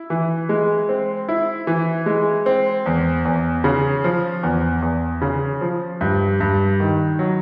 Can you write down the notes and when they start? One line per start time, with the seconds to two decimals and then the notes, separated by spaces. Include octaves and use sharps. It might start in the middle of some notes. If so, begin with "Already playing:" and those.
Already playing: E4
0.10 E3
0.49 G#3
0.89 C4
1.29 E4
1.67 E3
2.06 G#3
2.46 C4
2.86 E2
3.25 E2
3.64 C#3
4.04 F3
4.43 E2
4.82 E2
5.22 C#3
5.61 F3
6.01 G2
6.40 G2
6.80 D#3
7.19 F#3